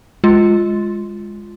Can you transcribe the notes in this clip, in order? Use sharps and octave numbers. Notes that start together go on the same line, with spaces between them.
G#3 F4